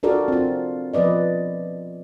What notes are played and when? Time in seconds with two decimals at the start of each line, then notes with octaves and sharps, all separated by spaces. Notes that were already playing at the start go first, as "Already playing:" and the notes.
0.03 D4 F4 F#4 A4 A#4 D5
0.28 C4 F4
0.93 F3 B3 B4 D5 D#5